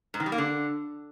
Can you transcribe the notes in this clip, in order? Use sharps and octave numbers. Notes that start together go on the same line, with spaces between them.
G#2
D#3
G3
A#3
D3